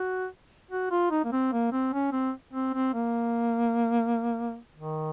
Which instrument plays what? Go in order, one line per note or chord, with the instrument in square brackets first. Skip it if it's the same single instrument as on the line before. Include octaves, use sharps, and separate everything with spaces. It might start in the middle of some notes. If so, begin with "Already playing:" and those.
Already playing: [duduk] F#4
F#4
F4
D#4
A#3
C4
A#3
C4
C#4
C4
C4
C4
A#3
D#3